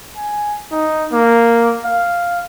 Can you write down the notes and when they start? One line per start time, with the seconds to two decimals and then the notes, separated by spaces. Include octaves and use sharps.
0.16 G#5
0.71 D#4
1.12 A#3
1.85 F5